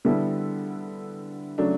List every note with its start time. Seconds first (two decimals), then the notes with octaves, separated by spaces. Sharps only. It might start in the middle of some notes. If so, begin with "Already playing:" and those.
0.05 D3 G3 B3 E4 A4
1.58 C#3 F#3 A3 D4